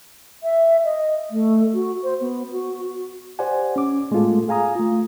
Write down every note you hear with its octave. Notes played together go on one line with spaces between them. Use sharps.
E5
D#5
A3
F#4
C5
B3
F#4
G4 C5 D5 F#5 G#5
C#4 D6
A2 G#3 A3 B3 F4 A4
G#4 F5 G#5 A#5 D#6
A3 F4